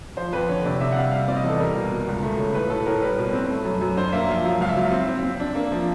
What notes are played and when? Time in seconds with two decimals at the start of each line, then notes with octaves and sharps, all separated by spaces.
0.17 F3 C5
0.33 F2 B4
0.48 D3 C#5
0.65 C3 D5
0.80 C3 E5
0.92 F#5
0.96 G3 F5
1.12 G3 F5
1.28 C4 D5
1.36 D#5
1.44 E2 A4
1.60 G3 A#4
1.76 B2
1.91 B2
2.07 C#2
2.23 A3
2.39 C#3
2.54 A2 B4
2.70 A2 A4
2.86 A2 A#4
3.02 G3 B4
3.18 B2
3.33 C4
3.50 A3
3.65 F#2
3.81 F#2
3.97 D4 C5
4.12 A#3 E5
4.29 F3 F5
4.45 F#3
4.61 C#2 F5
4.69 E5
4.76 F#3
4.92 C4
5.08 C4
5.23 C4
5.40 D4
5.55 A#3
5.72 F3